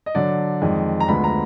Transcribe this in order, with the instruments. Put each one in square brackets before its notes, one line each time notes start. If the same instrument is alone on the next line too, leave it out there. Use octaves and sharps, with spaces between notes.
[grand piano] D#5
D3 F#3 D4 D5
F2 D#3 G#3 D#4
A#5
D2 D3 F3 G#3 B3 B5
A#5